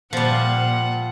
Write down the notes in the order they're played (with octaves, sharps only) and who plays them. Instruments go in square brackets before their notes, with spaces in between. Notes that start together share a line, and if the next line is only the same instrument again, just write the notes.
[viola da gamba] A#2 [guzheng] F3 G3 [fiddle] F#5